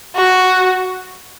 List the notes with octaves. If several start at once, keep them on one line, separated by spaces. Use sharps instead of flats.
F#4